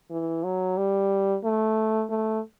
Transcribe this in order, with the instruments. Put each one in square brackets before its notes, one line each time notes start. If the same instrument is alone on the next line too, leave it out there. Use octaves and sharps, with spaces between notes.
[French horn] E3
F#3
G3
A3
A3